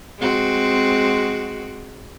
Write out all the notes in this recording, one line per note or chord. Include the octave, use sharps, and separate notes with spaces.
G#3 C4 F#4